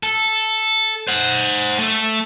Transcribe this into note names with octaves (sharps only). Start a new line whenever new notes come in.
A4
C5 F#5
A3